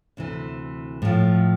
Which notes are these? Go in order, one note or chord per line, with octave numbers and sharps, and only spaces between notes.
D2 C3 E3
A2 F3